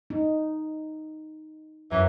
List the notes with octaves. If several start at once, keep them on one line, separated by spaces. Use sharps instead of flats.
D#4
F#2 E3 E5 A#5